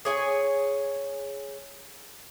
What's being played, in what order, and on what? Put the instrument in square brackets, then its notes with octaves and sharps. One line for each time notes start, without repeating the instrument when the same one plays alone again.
[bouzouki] G#4 C#5 G#5